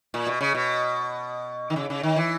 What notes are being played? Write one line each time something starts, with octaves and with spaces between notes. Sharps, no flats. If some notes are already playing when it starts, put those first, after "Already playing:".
A#2
B2
C#3
B2
D#3
C#3
C#3
D#3
E3